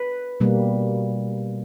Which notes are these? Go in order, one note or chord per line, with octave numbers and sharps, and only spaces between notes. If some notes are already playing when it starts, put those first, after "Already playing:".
Already playing: B4
B2 G3 A#3